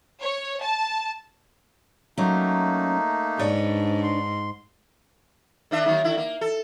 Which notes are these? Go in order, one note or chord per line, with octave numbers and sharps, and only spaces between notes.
C#5
A5
F#3 A3 A#3 C#4 D#4
G#2 D4 B4 C#5
C6
D#3 D4 E5
F#2 D#3 A#3
D3 E4
A#3
A4